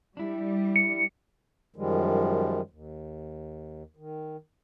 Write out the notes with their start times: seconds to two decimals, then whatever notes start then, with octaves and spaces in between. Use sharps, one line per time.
0.17 G3 D4 E4
0.76 C#7
1.76 F#2 D#3 F3 G3 G#3
2.70 D#2
3.96 D#3